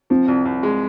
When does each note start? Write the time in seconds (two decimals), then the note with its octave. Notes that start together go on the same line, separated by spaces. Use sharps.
0.10 F3 C4
0.28 C2
0.45 C2
0.63 G#3